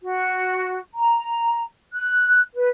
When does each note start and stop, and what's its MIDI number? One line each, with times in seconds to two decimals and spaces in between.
0.01 0.78 66
0.95 1.61 82
1.94 2.39 90
2.54 2.68 71